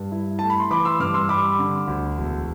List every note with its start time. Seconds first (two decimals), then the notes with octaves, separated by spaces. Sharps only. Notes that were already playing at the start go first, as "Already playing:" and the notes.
Already playing: G2
0.12 E4
0.39 A3 A5
0.50 B5
0.60 C6
0.70 E3 B5 D6
0.85 C6 E6
1.00 G2 D6 F6
1.14 C6 E6
1.29 G3 B5 D6
1.59 D3
1.88 D2
2.18 E1